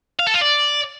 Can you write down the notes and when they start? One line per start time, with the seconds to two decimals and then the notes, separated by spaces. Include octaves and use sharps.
0.19 F5
0.26 A4
0.34 F4
0.41 D5